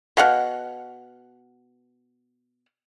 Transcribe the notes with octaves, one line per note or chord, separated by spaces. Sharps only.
B2 F5 F#5